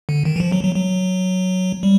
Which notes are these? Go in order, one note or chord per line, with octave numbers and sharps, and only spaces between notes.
D3
D#3
E3
F3
F#3
F#3
F#3
G3